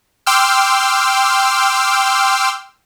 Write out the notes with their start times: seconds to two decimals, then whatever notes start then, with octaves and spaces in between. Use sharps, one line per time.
0.26 G5 C6 D6 E6 F6